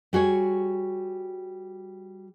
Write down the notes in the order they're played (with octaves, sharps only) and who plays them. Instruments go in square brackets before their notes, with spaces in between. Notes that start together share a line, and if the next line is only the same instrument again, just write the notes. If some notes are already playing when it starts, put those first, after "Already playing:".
[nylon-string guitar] G3 F#4 G#4 C#5